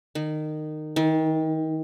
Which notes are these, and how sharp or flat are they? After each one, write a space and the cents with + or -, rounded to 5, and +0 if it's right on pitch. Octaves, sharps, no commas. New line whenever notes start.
D#3 -20
D#3 +30